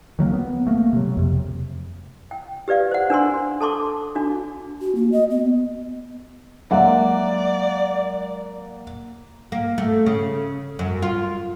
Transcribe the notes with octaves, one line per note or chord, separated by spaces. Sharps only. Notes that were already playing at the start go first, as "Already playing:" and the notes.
D#3 F#3 A3 A#3
B3
A3 A#3
C3 F#3
F2 C3
G5
G4 B4 D5 F5
C5 F#5
D4 A#4 G#5 C6
A4 A5 C6 D6
D4 F#4
F#4
A#3
D#5
B3
F#3 G#3 A#3 D5 E5 F#5
A#3
A3
C#3
F#2
F4